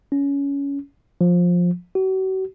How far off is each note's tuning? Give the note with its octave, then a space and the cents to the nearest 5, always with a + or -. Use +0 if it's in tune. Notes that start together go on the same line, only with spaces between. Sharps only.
C#4 +20
F3 +15
F#4 +40